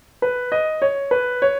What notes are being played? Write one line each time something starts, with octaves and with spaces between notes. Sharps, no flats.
B4
D#5
C#5
B4
C#5